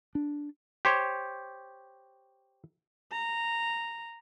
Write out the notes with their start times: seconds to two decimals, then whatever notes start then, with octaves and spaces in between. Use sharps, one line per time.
0.15 D4
0.85 G4 C5 C#5
3.12 A#5